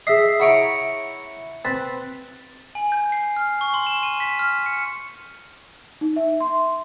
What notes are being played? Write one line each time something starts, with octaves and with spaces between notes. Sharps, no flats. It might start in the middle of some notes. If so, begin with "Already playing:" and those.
G#4 D#5 E5 C7
E4 C#5 F#5 A#5 C#7 D7
C4 B4 C6 A6
G#5
G6
C7
F6
C#6
C6
E7
D#7
B6
F6
C#7
D#4
E5
C6